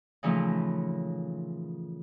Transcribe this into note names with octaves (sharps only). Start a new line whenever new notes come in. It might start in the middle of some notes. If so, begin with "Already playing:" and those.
A#2 C#3 E3 F3 A3 D#4